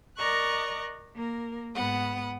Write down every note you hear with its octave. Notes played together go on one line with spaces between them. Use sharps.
A#4 D5 D#5 A#5 C#6 F#6
A#3 A#4
G#2 B3 F#5 D#6